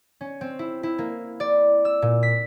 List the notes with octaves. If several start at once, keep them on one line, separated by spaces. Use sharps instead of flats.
C#4
C4
E4
E4
A#3
D5
E6
A#2
B6